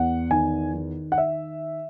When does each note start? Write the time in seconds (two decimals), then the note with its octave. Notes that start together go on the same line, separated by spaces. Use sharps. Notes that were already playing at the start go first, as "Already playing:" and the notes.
Already playing: E2 F#5
0.31 D#3 G#5
0.74 D#3
1.12 F#5
1.18 E5